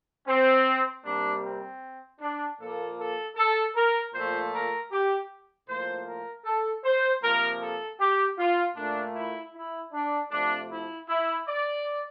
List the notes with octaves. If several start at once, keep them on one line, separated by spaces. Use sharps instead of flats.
C4
C3 G3 A#3 D4
C4
D4
A#2 F3 A#3 A4
A4
A4
A#4
A#2 F3 A3 C5
A#4
G4
A2 F3 A#3 C5
A#4
A4
C5
C3 F3 A#3 A#4
A4
G4
F4
A#2 A3 D4
E4
E4
D4
C3 F3 A3 D4
E4
E4
D5